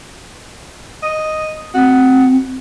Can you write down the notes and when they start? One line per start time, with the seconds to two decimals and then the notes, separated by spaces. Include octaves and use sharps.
1.03 D#5
1.75 C4 F#4